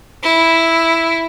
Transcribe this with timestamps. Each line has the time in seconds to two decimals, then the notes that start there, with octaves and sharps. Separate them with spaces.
0.23 E4